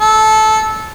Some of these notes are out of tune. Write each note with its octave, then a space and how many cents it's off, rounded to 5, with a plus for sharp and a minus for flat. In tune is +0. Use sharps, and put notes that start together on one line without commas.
A4 -15